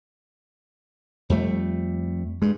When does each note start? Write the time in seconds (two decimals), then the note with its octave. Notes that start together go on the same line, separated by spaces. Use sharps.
1.30 F2 G3 A3
2.42 G2 G#3